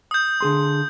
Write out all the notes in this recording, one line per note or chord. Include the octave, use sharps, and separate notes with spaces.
D#6 G6
D3 G#4 C6